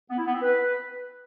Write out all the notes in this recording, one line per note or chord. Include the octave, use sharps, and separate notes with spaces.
B3
E4
B3
C4
B4